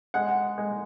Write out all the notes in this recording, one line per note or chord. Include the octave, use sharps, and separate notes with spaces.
G#3 F#5
G#3